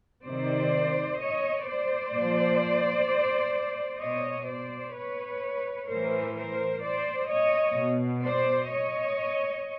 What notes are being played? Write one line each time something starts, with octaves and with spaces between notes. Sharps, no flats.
C3 D#3 C5 D5
C#5 D#5
C5 D5
A#2 F3
B2 C#5 D#5
C5 D5
B4 C#5
A2 E3 A#4 C5
A#4 C5
C5 D5
C#5 D#5
B2
C5 D5
C#5 D#5